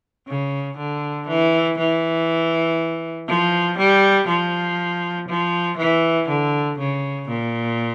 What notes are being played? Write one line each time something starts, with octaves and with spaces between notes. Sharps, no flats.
C#3
D3
E3
E3
F3
G3
F3
F3
E3
D3
C#3
A#2